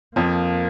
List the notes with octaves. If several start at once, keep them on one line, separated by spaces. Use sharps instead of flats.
F2 F3 A#3